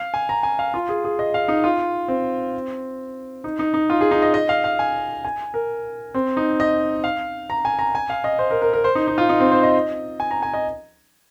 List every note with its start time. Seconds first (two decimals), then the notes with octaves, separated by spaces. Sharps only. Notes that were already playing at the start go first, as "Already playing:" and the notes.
Already playing: F5
0.14 G#5
0.29 A#5
0.43 G#5
0.59 F5
0.74 F4
0.89 G#4
1.04 G#4
1.19 D#5
1.34 F5
1.48 D#4
1.64 F4
2.08 C4
3.44 D#4
3.59 D#4
3.74 D#4
3.90 F4
4.01 G#4
4.11 D#4
4.22 D#5
4.34 D#5
4.49 F5
4.64 F5
4.79 G#5
5.25 G#5
5.54 A#4
6.14 C4
6.37 D#4
6.60 D#5
7.04 F5
7.50 A#5
7.65 G#5
7.79 A#5
7.95 G#5
8.10 F5
8.24 D#5
8.39 C5
8.51 A#4
8.62 A#4
8.73 A#4
8.84 C5
8.95 D#4
9.07 D#4
9.18 F4
9.29 D#4
9.40 C4
9.51 C5
9.63 D#5
10.20 G#5
10.31 A#5
10.42 G#5
10.54 D#5